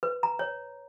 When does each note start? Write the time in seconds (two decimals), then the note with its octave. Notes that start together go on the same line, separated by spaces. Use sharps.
0.03 B4
0.23 A#5
0.39 C#5